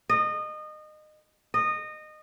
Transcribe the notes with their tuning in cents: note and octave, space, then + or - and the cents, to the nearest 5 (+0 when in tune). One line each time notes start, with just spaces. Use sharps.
D#5 -25
D#5 -20